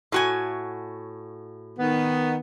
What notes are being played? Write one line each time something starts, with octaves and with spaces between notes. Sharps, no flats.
A2 F#4 G#5
D#3 B3